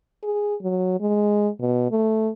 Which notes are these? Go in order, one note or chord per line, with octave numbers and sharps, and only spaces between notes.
G#4
F#3
G#3
B2
A3